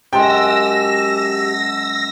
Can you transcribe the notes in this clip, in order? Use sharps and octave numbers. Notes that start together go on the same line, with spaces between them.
F#2 G#3 G4 G5 A5 E6 A#6